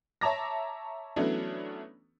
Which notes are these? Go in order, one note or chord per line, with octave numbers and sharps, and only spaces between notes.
C#5 E5 A5 A#5 D6 A#6
E3 F#3 A3 B3 C#4 D4